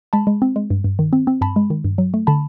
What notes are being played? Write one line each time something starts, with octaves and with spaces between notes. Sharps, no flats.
G#3 A5 B5
G#3
C4
G#3
G2
G2
D#3
C4
C4
G2 A5 B5
G#3
D#3
G2
F#3
A3
D3 A5 B5